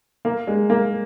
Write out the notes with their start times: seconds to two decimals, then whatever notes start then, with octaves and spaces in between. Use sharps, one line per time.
0.25 A#3
0.47 G#3
0.70 A#3